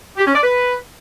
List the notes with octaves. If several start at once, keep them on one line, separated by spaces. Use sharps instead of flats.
G4
C#4
D5
B4